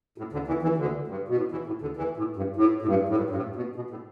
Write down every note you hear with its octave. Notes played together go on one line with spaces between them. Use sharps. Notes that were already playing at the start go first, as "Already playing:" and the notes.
A2
D2 D3
E2 E3
E2 E3
D2 D3
G2
B2
A2
E2 E3
A2
D2 D3
E2 E3
A2
G2
A2
A2
G2
A2
G2
G2
A2
B2
B2
A2